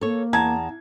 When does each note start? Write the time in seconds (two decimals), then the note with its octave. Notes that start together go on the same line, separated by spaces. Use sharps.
0.01 A#3 A4 C#5
0.33 E2 A5 A#5 G#6